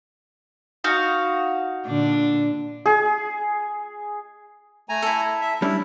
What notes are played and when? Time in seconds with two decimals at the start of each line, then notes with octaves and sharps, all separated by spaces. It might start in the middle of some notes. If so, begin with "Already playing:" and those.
0.84 D#4 F#4 F5
1.86 A#2 D3 D4
2.86 G#4
4.89 A3 G#5 A#5
5.02 E4 A4
5.41 E5
5.62 G3 C#4 D4 E4